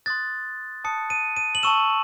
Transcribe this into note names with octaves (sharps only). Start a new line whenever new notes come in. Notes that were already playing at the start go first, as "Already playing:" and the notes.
C6 D#6 F#6 A6
A5 D#6 F#6 C#7
D#7
D#7
F#7
A5 C#6 E6 E7